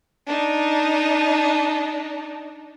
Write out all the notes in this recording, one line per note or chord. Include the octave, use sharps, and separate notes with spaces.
D4 D#4